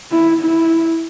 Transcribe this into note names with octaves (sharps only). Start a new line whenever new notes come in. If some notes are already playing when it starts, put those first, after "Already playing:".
E4
E4